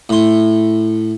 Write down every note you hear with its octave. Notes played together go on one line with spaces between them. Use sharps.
A2 C6